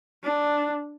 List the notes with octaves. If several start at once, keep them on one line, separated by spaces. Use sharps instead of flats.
D4